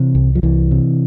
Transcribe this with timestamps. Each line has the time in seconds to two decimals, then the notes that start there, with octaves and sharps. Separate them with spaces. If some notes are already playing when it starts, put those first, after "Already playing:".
Already playing: C3 E3
0.15 C2
0.35 F3
0.43 C2 E3
0.71 C3